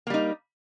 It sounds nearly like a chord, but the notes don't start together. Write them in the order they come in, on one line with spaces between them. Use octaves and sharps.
A#3 G3 D#4